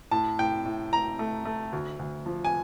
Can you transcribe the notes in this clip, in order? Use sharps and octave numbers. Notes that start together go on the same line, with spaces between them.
A2 A5
A2 G5
A2
A2 A#5
A3
A3
D2
D2
F3
G#5